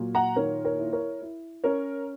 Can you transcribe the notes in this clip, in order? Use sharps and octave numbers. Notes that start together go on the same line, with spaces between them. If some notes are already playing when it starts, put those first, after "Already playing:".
Already playing: A#2 F#3
F#5 A#5
D#3 A#4 C#5
A#4 C#5
E4
A#4 C#5
E4
C#4 A#4 C#5